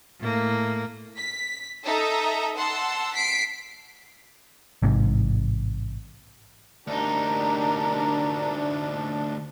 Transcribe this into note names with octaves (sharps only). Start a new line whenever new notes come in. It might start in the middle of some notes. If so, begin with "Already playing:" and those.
A2 A#3
B6
D#4 A4 E5 A#5 D#6
F#5 A5 C6 E6
B6 C7 D7
A1 G#2 C3
D2 D4 D#4 G4 A#4